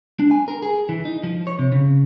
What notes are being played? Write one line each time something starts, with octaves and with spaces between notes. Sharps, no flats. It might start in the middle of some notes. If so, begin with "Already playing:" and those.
D4
G#5
A#4
G#4
E3
D#4
F3
C#5
C3
C#3